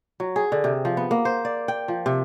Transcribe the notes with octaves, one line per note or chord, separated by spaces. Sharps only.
F#3
G#4
D3
C3
F3
B3
A#3
C5
D5
G5
F3
C3